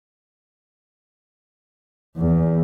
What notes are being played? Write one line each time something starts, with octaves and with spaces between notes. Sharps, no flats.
E2